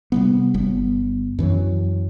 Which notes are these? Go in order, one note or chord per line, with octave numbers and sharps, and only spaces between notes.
C3 G3 B3
G1 G3 B3
F#2 E3 F#3